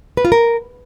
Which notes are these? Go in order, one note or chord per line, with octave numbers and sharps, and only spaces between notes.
B4
F4
A#4